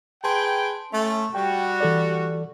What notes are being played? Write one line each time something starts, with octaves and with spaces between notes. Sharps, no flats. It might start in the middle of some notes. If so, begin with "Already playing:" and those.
G#4 B4 G5 A5 C6
A3 C#4
G3 F#4 G5
E3 A4 D5